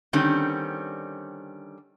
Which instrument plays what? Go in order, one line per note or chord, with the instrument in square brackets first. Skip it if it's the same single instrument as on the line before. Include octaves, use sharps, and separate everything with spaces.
[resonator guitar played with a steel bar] D3 D#3 G3 C4 C#4